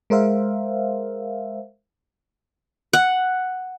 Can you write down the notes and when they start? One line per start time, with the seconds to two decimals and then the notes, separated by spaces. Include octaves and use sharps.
0.10 G#3 A#4 C5 E5 F5
2.93 F#5